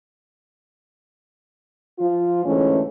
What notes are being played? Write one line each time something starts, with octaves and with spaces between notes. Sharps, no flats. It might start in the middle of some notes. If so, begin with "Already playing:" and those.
F3 F4
D2 G#2 E3 A3 C#4